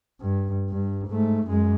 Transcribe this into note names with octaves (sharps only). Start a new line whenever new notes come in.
G2
G2
G#2 A3
F#2 G#3